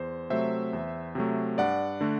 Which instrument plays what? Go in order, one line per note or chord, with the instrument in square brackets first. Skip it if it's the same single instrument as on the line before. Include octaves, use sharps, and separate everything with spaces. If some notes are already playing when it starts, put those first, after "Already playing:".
Already playing: [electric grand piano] E2 C5
C3 F#3 A3 C5 E5
E2
C3 F#3 A3
G2 D5 F#5
D3 A3